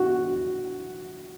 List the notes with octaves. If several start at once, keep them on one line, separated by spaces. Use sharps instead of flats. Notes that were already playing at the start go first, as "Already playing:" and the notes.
Already playing: F#4